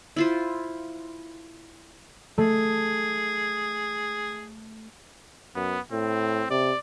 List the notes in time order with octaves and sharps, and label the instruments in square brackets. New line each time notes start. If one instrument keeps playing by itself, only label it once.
[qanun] E4 F4 C5
[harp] A3 [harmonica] G#4
[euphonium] F#2 [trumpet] B3
[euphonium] A2 [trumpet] C4
[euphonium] C3 [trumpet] D5